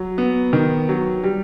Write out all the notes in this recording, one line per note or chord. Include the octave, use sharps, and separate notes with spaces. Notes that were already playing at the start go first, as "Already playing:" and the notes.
Already playing: F#3
B3
D#3
F#3
G3